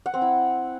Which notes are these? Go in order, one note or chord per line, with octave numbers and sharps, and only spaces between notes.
F#5
C4
E4